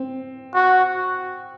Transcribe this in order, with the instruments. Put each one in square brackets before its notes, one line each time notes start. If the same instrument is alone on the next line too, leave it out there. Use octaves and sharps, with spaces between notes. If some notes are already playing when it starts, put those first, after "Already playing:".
Already playing: [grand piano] C4
[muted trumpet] F#4